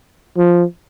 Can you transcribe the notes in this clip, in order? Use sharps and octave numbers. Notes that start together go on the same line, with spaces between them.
F3